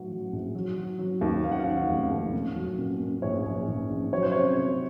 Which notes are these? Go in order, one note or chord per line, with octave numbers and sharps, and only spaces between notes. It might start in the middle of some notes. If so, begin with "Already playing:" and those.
Already playing: A2 F#3 F#5
F#3
A#1
F#3
F#3
F#3
D#2
F#3 F5
F#5
F5
D#3
F1
D#2
A#2
F#3
A#2
A#2
A#1 C#5
A#1
A#1
A#1
F#3 C#5
C5
C3 C#5
C3